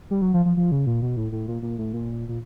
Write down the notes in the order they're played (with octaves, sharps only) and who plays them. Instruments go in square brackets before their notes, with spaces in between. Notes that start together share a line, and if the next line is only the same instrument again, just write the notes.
[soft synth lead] G3
F#3
F3
F3
F3
C#3
A#2
B2
A2
A2
A#2
A#2
A2
A#2
A#2